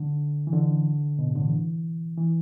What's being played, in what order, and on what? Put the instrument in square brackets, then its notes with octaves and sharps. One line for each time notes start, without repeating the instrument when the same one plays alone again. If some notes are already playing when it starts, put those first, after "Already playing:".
Already playing: [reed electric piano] D3
E3
D3
B2
A2
D3
E3
E3